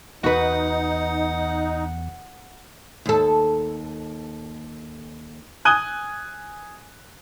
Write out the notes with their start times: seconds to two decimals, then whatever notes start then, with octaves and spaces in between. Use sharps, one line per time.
0.24 E2 D#4 F#4 B4 F#5
3.06 D#2 A4
5.65 G#5 D#6 F#6 G#6 D#7 G7